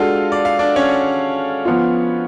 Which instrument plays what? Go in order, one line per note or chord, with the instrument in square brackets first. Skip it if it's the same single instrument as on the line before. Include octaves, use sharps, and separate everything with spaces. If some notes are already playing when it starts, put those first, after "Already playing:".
Already playing: [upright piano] G#3 D4 F#4 A4 [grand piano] F4 F5
[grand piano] D5
F5
D4 D5
C#4 C#5
[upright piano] F3 B3 F4